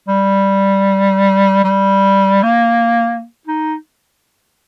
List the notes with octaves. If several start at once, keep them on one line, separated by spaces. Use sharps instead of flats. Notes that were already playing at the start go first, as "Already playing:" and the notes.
G3
G3
A#3
D#4